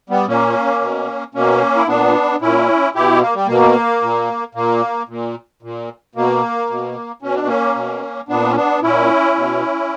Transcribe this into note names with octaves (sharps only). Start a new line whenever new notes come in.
G3 B3
A#2 A#3 C#4
B2
B2 A#3 C#4
E4
A#2 B3 D4
A#2 C#4 E4
B2 E4 G4
A#3
G3
B2 A#3
A#2
A#2 A#3
A#2
A#2
B2 A#3
B2
B2 C#4
D4
A#3 C#4
B2
A#2 B3 D4
C#4
B3 D4
A#2 C#4 E4
B2